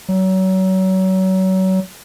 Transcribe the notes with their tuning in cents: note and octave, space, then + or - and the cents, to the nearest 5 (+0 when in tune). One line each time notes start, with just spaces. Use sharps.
F#3 +30